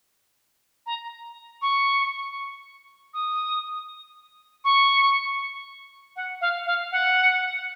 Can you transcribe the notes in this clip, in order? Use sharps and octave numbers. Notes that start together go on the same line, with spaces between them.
A#5
C#6
D#6
C#6
F#5
F5
F5
F#5